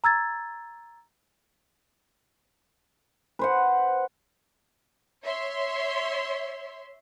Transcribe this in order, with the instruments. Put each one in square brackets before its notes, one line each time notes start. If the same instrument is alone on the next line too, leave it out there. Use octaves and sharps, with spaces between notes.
[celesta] A#5 E6 G#6 A6
[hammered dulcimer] B4 C5 F#5
[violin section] C#5 E5 C6